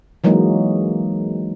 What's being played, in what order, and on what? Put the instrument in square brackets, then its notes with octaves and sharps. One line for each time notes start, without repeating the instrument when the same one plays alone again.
[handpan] E3 F#3 G#3 A#3 D#4